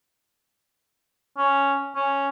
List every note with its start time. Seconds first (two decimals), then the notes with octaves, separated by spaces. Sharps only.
1.38 C#4
1.95 C#4